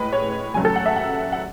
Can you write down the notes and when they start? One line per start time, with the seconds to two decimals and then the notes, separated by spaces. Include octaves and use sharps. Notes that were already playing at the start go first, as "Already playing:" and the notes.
Already playing: A2 G#3 B4
0.13 C#5
0.54 D#2 C#3 F#3 A3 G#5
0.65 A4
0.76 F#5
0.86 E5
0.96 F#5
1.32 F#5